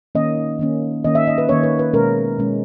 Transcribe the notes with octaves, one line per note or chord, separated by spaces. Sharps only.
D#3 A#3 C#4 D#5
D#3 A#3 C#4
D#3 A#3 C#4 D#5
E5
D#5
B4
D#3 A#3 C#4 C#5
B4
B4
B2 G#3 C#4 A#4
B2 G#3 C#4